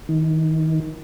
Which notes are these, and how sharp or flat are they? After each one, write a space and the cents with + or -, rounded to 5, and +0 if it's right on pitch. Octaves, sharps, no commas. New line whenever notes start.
D#3 +30